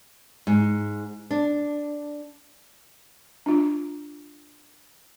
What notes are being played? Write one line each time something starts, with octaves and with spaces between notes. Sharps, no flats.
G#2
D4
D4 F4